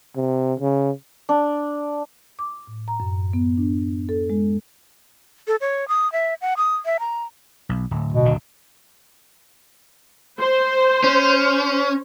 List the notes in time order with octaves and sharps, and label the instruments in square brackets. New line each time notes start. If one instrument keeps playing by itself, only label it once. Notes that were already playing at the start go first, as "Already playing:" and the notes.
[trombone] C3
C#3
[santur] D4
[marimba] D6
A2
A#5
F#2
B3
D4
A4
G#3
[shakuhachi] A4
C#5
D#6
E5
F#5
D#6
E5
A#5
[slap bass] B1
D1
[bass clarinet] B2
[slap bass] D1 D3
[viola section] C5
[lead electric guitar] C#4